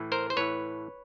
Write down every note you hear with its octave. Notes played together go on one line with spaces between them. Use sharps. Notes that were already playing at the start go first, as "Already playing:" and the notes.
Already playing: A2 E3
A#4 C5
C5
A2 E3 B4 C#5